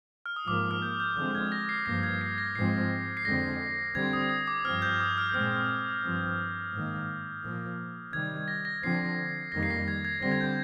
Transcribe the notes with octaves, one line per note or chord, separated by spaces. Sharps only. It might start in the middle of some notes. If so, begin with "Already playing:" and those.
F6
D#6
G#2 F3 A#3 D6
F6
G6
G6
D3 F3 G#3 C4 G6
G#6
A#6
C7
G2 F3 A#3 A#6
G#6
C7
A#6
G#2 F3 G#3 C4 C7
C7
F2 D3 G#3 C4 A#6
D3 G3 C4 G#6
D#6
D#6
D6
G2 F3 C4 F6
G6
D#6
F6
G6
A#2 G#3 C4 F6
G2 F3 C4
G#2 D#3 A#3
A#2 F3 A#3
C3 D#3 G3 G#6
A#6
A#6
D3 F3 C4 C7
F2 D#3 G3 A#3 A#6
C7
A#6
G#6
G#6
D3 G3 C4 A#6
G#6
G6